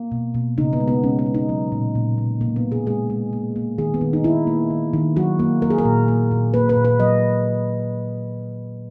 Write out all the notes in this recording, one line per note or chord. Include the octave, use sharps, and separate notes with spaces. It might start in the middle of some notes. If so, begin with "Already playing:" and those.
Already playing: A#3
B2
B2
C#3 D#4
B3
G#3
B3
G#3 C#4
B3
G#3
D#4
F#3 B3
A#2
A#2
A#3
B2 A#3
B3
B2
G#4
G#3 G#4
G#3
A#3
A#3
D#3 G#4
B3
D#3
D#4
D#3 E4
A#3
D#3
D#3
F#3 F#4
A#3
A#3 A#4
G#4
A#4
A#2
A#3
A#2
A#3 B4
B4
A#2
B4
F#3 D#5